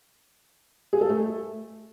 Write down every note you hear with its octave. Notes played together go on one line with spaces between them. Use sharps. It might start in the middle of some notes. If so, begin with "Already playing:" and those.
G#4
A4
A3